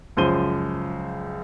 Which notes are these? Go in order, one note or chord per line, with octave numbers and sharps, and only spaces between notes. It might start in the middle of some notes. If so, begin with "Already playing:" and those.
C#2 F#2 F3 C5 D#7 G7